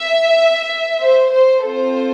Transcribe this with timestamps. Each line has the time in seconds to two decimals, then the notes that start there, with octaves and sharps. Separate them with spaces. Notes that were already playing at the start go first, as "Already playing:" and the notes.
Already playing: E5
1.03 C5
1.33 C5
1.64 C4 F4 A4 C5